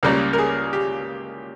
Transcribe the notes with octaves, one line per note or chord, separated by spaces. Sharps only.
C#2 C#3 G3 A#3 A#4
A#4
G#4
G4